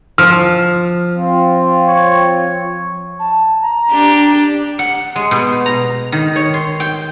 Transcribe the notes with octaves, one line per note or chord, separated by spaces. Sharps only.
F3 F6
C4 F4
C#5
A5
A#5
D4 G4
F#5
G#3
B2
A#5
D#3
C#5
C6
G5